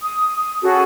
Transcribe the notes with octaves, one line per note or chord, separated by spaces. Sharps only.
D#6
C#4 F#4 G#4 A4